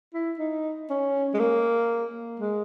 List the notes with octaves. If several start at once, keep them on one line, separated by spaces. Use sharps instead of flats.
E4
D#4
C#4
G#3
A#3
G#3